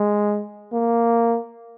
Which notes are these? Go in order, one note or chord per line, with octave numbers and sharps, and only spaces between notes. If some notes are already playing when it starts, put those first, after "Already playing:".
Already playing: G#3
A#3